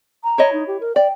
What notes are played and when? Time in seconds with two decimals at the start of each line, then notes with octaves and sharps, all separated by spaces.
0.24 A#5
0.38 E4 C#5 D#5
0.53 D#4
0.67 G4
0.80 A#4
0.96 D5 G5